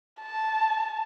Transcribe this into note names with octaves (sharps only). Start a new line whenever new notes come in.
A5